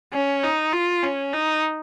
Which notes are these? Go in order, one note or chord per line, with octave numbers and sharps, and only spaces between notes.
C#4
D#4
F4
C#4
D#4